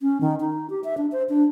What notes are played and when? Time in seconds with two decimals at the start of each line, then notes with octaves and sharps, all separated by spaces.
0.01 C#4
0.21 D#3
0.40 D#4
0.70 G4
0.84 E5
0.97 D4
1.12 C5
1.29 D4